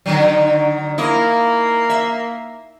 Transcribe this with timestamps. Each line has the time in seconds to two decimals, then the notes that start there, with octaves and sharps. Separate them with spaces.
0.06 D3 D#3 F#3
0.98 A#3 E4 D#5
1.89 E5